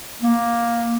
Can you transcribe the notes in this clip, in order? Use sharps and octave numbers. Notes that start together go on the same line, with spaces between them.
A#3